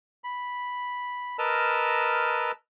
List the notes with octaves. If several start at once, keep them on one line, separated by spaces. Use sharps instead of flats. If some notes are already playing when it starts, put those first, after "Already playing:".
B5
A#4 B4 D#5 A5 E6 F6